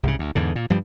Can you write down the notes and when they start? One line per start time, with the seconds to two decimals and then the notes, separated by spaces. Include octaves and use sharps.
0.03 C2 G#2 C#3
0.19 D2
0.35 E2 G#2 D3
0.55 A#2
0.70 G2 F3 G3